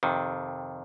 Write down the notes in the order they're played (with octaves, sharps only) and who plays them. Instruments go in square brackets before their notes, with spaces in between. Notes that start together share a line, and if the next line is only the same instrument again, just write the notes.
[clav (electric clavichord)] F2 C3 D#3